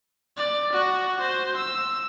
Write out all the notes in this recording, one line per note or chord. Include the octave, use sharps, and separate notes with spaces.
D5
F#4
C5
E6